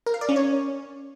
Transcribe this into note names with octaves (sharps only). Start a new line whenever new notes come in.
A#4
F5
D5
C#4
C#5